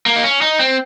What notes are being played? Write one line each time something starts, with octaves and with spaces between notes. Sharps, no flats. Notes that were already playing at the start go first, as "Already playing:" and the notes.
A#3
D#4
C#4
D#4
C4